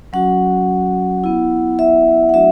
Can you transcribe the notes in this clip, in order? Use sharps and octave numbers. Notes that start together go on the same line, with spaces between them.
F#3 C#4 F#4 F#5
B3 E4
E5
F#5
F#3 A3 D4 F#4 E5